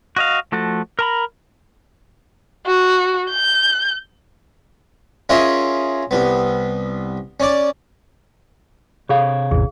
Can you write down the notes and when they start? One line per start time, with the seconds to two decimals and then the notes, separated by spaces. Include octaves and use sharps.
0.16 F#4 D#5 F5
0.52 F3 A3 F#4 A4
0.99 A#4 A#5 B5
2.67 F#4
3.31 G6
5.29 C#4 F4 G#4 A#4 D#5 E5
6.11 C2 B3
7.40 C#4 D5
9.09 C3 G#4 A4 C#5 F5
9.51 A1 E2 G#4